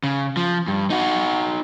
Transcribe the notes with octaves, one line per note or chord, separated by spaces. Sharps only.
C#3
F3
G2
D#4 F#4